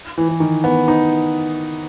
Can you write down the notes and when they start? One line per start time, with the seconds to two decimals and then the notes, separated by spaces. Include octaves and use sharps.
0.18 E3
0.29 E3
0.40 D#3
0.64 B3
0.88 D#4